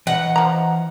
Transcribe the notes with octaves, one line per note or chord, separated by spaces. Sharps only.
E3 D#5 F#5
F3 A#5